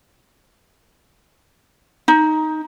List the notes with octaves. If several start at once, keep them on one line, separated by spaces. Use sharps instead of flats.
D#4